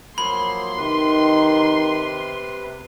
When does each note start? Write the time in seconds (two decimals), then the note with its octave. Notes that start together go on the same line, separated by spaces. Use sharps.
0.18 F3 F#3 A#3 B5 C6
0.77 C3 D#3 B4